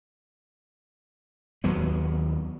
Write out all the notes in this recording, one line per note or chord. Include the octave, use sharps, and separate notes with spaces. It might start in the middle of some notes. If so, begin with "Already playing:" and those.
D#2 F#3 B3